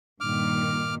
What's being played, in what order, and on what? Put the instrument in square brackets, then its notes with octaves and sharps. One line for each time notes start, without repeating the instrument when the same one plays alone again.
[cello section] G2 A#2 D#3 [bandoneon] D6 F6